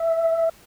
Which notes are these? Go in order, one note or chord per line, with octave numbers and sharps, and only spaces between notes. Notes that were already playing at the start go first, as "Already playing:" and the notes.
Already playing: E5